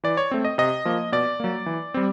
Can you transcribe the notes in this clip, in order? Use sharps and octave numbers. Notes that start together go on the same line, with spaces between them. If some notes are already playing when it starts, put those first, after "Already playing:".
E3 D5
C#5
A3 C4
D#5
C3 D#5
F3 A#3
B2 D5
F#3 A#3
E3
G3 C4